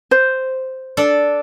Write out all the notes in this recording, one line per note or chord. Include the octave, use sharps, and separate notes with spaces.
C5
D4 A4 D5